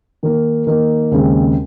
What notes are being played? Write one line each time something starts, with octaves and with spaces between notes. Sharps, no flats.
D#3 A#3 D#4 A#4
D#3 A#3 D#4 A#4
D#2 C#3 G#3 C4